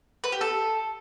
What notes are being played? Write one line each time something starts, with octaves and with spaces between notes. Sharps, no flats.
B4
G4
A4